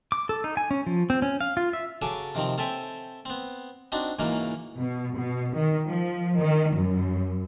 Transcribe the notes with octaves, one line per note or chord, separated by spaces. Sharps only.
D6
A4
D#4
G#5
C#4
F3
C4
C#4
F5
F4
E5
C#3 F#3 A4 G#5 A5 D6
C3 D#3 F3 C4
C4 A4 C#5 E5 G5 G#5
B3 C4
C4 D4 D#4 F#4
C#2 G#2 C#3 E3 F#3 A#3
B2
B2
D#3
F3
D#3
F#2